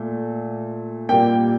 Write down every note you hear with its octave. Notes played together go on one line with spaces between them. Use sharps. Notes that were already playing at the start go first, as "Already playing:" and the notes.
Already playing: A#2 A3
A#2 G3 A#3 G5